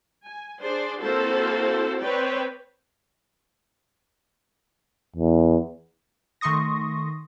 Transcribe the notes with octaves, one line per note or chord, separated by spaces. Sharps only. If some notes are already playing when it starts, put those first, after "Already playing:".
G#5
D4 G#4 C5 D5
A#3 C4 E4 F#4 A4 C5
C4 B4 C#5 D5 G5
E2
D#3 A3 C6 C#6 D#6 A#6